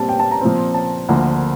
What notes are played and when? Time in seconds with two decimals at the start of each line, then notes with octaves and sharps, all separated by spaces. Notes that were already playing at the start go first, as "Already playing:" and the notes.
Already playing: A#2 G3 C4 A5
0.09 G5
0.19 A5
0.31 A#5
0.41 A#2 F3 C4
0.74 A5
1.09 D2 D3 F3 A#3